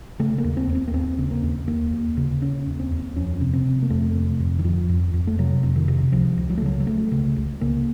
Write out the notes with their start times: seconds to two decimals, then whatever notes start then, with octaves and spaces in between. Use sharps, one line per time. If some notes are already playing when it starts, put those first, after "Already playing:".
0.19 C#3 A3
0.38 A#3
0.44 D#2
0.57 C4
0.69 D#2
0.75 C4
0.88 A#3
0.93 D#2 C4
1.18 C#3
1.31 A#3
1.43 D#2
1.68 D#2 A#3
1.92 D#2
2.17 C#3
2.42 C#3 C#4
2.67 D#2
2.80 C4
2.92 D#2
3.16 F2 C#4
3.41 C3
3.53 C4
3.65 C3
3.83 A#3
3.90 F2 A3
4.15 C3
4.40 F2
4.59 D#3
4.64 F2 F3
4.89 F2
5.14 F2
5.27 A3
5.38 C3 F#3
5.63 F2
5.76 D#3
5.88 C3
6.12 C#2 F3
6.38 C#2
6.50 F#3
6.58 A3
6.62 C#3 F#3
6.80 F#3
6.87 C#2 A3
7.12 C#3
7.36 C#2
7.61 C#3 A#3